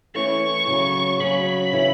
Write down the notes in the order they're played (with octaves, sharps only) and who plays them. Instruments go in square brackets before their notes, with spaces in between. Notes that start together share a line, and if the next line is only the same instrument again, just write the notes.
[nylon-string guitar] E3 A3 C#4 E4 [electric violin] C#6
[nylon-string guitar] C#3 F#3 C#4
[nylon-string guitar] C#3 F#3 C#4 [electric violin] B5
[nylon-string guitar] C#3 E3 C#4 E4